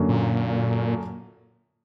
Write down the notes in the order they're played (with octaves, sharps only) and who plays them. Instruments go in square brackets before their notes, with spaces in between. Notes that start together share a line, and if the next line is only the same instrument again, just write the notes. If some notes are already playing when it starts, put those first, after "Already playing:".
Already playing: [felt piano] F#2 D3 F#3 A#3
[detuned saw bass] A#2